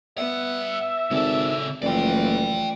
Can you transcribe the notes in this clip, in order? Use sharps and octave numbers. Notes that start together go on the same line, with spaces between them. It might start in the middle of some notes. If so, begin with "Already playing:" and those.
G2 B3 E5 F#5
G#1 C#3 A4 D5
F#1 E3 F3 A3 D5 G5